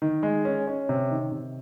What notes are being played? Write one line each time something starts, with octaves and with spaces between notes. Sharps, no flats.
D#3
G#3
C#4
C#4
C3
D#3
C3